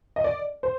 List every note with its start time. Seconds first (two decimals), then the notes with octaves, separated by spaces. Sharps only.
0.16 D#5
0.24 D5
0.63 C5